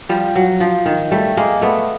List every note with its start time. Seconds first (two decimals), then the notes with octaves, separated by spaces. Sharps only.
0.09 F3 G3
0.35 F#3
0.60 F3
0.86 D#3
1.11 G3 A3
1.37 G#3 A#3
1.62 A3 B3